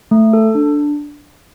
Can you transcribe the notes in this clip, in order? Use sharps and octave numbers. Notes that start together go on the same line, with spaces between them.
A3
A4
D4